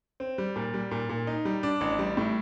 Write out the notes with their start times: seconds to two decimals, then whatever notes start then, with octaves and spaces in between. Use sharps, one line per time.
0.20 C4
0.38 G3
0.56 A#2
0.74 G3
0.91 A#2
1.09 A#2
1.27 D#4
1.45 G3
1.63 D4
1.81 A1
1.99 G3
2.17 A2